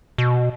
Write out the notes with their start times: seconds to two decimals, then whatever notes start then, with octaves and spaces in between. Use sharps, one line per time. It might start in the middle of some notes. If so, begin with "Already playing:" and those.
0.18 B2